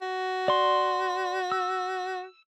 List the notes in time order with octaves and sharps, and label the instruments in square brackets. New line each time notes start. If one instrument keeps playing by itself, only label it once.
[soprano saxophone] F#4
[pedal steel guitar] D5 C6
E6